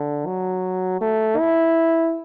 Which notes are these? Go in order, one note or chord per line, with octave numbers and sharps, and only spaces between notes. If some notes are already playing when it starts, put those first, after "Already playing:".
Already playing: D3
F#3
A3
E4